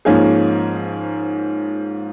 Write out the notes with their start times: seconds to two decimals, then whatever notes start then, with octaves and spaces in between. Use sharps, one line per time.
0.05 G#2 F3 A#3 C#4 G#4